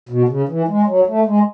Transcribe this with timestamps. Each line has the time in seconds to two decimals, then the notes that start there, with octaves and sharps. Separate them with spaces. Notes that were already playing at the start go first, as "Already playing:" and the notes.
0.09 B2
0.29 C#3
0.49 E3
0.68 G#3
0.87 F#3
1.07 A3
1.26 G#3